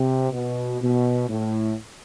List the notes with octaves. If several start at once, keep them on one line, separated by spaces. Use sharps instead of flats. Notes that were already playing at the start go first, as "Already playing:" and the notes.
Already playing: C3
B2
B2
A2